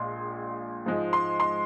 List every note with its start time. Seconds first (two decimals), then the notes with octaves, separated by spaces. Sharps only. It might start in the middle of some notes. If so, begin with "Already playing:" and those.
Already playing: A#1 A#2 G#3 C6
0.86 G#2 F3 G#3
1.13 C6
1.40 C6